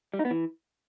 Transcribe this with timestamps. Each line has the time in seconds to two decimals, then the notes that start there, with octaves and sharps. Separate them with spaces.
0.14 G3
0.19 D#4
0.25 B3
0.31 E3